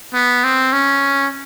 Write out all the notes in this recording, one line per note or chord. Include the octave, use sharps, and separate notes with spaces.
B3
C4
C#4